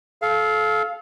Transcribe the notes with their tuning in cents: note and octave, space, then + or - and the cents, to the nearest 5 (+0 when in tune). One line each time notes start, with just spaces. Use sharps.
A4 -30 F5 +0